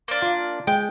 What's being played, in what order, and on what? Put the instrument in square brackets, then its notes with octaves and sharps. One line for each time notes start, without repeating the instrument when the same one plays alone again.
[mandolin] A#3 D4
[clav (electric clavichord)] F4
[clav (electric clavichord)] G#3 [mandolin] G5